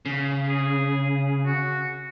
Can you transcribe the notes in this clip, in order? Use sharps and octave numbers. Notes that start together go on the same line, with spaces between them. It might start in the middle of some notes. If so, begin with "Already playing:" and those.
C#3
G#4
F#4